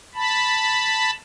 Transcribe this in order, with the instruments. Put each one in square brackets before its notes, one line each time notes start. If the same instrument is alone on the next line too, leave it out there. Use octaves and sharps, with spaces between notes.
[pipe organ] A5 B5